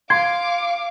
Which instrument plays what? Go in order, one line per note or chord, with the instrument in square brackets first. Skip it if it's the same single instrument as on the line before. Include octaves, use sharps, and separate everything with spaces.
[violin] F5 D6 [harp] C6 [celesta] G#6